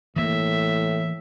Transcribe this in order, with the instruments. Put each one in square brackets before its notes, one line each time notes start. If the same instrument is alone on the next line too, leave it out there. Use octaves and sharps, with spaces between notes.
[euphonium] A2 [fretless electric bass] E3 A#3 [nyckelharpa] E5